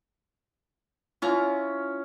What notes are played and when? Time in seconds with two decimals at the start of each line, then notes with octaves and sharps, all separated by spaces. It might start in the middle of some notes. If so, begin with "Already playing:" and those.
1.22 C#4 E4 F4 A#5